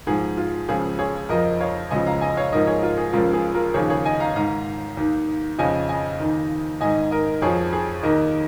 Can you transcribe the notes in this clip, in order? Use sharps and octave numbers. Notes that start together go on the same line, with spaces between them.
G#2 F3 G#4
F4
C#2 C#3 F3 G#4
G#4 C#5
F2 F3 A#4 D#5
C#5 F5
C#2 C#3 F3 D#5 G#5
F5 A#5
D#5 G#5
C#5 F5
G#2 F3 A#4 D#5
G#4 C#5
F4 A#4
G#4
C#2 C#3 F3 F4 A#4
G#4
F4 A#4
D#2 C#3 F3 G#4 C#5
G#4 C#5
D#5 G#5
F5 A#5
G#2 D#3 F5 A#5
D#2 D#3
F2 C#3 F3 D#5 G#5
D#5 G#5
D#2 D#3
G#2 D#3 D#5 G#5
A#4 D#5
F2 F3 G#4 C#5
G#4
D#2 D#3 A#4 D#5